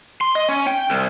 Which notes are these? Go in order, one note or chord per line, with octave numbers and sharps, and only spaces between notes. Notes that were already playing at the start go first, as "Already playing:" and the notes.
C6
D#5
C#4
G5
C2